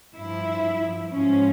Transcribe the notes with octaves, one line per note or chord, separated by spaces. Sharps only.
G2 F3 E4
G#2 F3 C#4